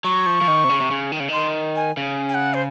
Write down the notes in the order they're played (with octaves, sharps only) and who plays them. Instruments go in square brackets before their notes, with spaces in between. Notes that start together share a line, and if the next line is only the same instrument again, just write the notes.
[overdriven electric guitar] F#3 [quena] C#6
[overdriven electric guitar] F3
F3
D#3
C3
C#3
C3
C#3
D#3
C#3
[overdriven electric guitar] D#3 [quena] C6
[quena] G#5
[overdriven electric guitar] C#3
[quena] G#5
F#5
C5